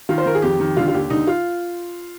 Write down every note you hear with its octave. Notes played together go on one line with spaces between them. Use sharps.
D#3 F4
C5
D#3 A#4
G#4
F2 G4
D#3
D3 F4
F4
D#2 G4
D3 D#4
F4